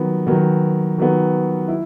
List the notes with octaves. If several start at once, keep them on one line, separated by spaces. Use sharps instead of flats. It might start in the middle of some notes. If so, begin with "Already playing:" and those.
Already playing: D#3 F#3 B3
D#3 F#3 B3
D#3 F#3 B3
E4